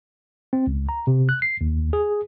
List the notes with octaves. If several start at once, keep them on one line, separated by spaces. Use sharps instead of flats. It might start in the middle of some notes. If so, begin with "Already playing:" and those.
C4
C#2
A#5
C3
F#6
C7
D#2
G#4